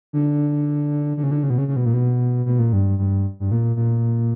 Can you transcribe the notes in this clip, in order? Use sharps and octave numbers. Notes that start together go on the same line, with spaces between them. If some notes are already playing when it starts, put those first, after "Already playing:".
D3
D3
C#3
D3
C#3
B2
C#3
C#3
B2
A#2
B2
B2
A#2
G2
G2
G2
A#2
A#2